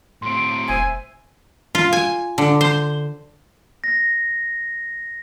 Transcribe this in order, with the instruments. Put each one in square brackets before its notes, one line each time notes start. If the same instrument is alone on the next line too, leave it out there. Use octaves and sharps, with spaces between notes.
[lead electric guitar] A2 C4 [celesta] C6 D7
[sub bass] F1 [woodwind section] C5 E5 G#5
[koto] F4
G#5
D3
C5
[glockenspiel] A#6